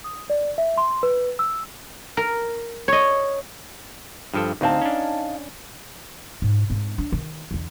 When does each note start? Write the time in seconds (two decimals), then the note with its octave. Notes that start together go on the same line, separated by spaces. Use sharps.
0.04 D#6
0.30 D5
0.58 E5
0.78 C6
1.03 B4
1.39 E6
2.17 A#4
2.88 C#5 D#5
4.34 G2 F3 A4
4.61 D2 C4 D#4 F5 A5
4.81 C#4 D4
6.42 G#2
6.70 G#2 C4
6.98 D4
7.12 D#3
7.51 E2 D3